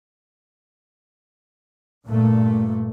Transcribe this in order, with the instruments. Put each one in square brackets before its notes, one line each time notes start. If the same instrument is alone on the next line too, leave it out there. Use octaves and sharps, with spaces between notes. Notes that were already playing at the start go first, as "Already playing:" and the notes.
[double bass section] G2 A#2 A3